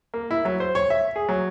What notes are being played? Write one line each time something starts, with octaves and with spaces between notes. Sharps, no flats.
A#3
E4
F#3
C5
C#5
E5
G#4
F#3